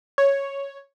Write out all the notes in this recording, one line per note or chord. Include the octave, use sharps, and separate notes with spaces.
C#5